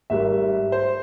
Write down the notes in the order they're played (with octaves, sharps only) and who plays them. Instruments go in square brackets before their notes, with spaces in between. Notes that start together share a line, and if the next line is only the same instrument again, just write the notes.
[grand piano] G#1 G#2 G3 E5
C5